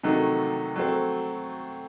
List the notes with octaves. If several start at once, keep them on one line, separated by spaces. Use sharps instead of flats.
C3 D#3 F#3 A3 D#4
F#3 A3 C4